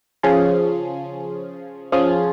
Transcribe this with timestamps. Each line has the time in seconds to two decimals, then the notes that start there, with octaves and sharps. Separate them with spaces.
0.23 C#3 F3 C#4 F4 G#4
1.92 F3 C#4 F4 G#4